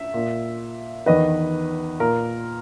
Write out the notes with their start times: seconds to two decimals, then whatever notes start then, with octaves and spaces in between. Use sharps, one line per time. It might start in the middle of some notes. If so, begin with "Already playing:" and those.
Already playing: E5
0.14 A#2
1.06 E2 D#3 B4 D#5
2.00 A#2 A#4